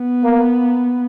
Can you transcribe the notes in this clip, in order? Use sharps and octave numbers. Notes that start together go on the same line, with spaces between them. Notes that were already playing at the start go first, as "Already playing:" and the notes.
Already playing: B3
A#3